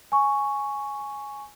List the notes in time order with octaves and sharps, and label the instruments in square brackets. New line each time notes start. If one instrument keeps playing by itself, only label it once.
[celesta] G#5 C#6